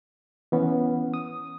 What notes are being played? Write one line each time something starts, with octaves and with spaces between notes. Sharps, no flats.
E3 B3 C#4
D#6